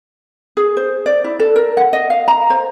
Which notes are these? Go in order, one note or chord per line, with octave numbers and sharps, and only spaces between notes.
G#4
C5
D5
E4
A4
A#4
F#5
D#5
F5
A#5
C5